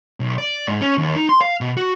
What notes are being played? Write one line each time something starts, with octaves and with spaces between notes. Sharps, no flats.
B1
D5
G#2
C#4
D#2
D#4
C6
F5
B2
F#4